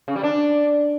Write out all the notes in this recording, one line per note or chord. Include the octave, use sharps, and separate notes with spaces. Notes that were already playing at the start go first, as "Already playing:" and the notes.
C#3
G3
D4